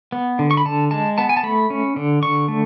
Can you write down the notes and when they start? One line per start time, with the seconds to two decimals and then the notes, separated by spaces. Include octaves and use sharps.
0.12 B3
0.39 D3
0.51 C#6
0.57 B5
0.65 D3 A5
0.91 G#3 A5
1.18 B3 A5
1.29 G#5
1.37 A5
1.43 A3 B5
1.70 C#4
1.96 D3
2.23 D3 C#6
2.48 A3